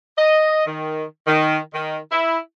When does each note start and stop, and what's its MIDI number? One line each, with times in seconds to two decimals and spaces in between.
0.17 0.65 75
0.67 1.03 51
1.27 1.58 51
1.73 1.98 51
2.12 2.37 64